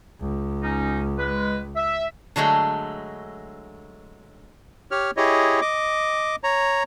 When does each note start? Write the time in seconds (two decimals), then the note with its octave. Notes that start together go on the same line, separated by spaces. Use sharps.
0.20 C#2
0.63 C#4 D#4
1.18 G#3 B4
1.76 E5
2.36 D3 F#3 G#3 A3
4.91 G4 C#5 F6
5.17 E4 G4 G#4 C#5 D#5
5.61 D#5 D6
6.44 C#5 A#5